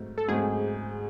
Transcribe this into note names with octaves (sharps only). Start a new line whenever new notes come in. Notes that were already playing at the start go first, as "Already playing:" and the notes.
Already playing: G#2 F#3 A3 C4
A4
G#2 F#3 A3 C4 G#4